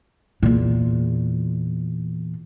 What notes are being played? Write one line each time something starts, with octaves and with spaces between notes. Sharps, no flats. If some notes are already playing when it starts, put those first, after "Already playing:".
E2 A#2